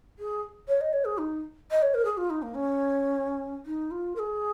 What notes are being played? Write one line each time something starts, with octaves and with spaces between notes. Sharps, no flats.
G#4
C#5
D#5
C#5
G#4
D#4
D#5
C#5
A#4
G#4
F4
D#4
A#3
C#4
D#4
F4
A#4
G#4